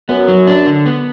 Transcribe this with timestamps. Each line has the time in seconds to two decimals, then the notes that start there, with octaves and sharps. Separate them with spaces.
0.09 F#2 B3
0.28 F#3
0.47 D4
0.67 D3
0.86 B3